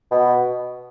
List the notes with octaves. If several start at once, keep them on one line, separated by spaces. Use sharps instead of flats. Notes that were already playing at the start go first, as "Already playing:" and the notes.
B2